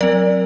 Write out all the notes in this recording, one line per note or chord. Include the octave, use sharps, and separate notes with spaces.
F#3 C4 A#4 D5